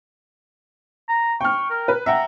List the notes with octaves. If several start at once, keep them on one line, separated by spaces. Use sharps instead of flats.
A#5
G5 C#6 F6
A#4
B4
E5 F#5 G5 A#5